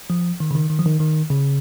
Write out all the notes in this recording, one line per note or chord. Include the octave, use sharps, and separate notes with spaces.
F3
D#3
C#3
D#3
D#3
F3
D#3
D#3
C#3